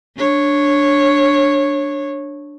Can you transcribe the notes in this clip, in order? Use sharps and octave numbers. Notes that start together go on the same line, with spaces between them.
D4 C#5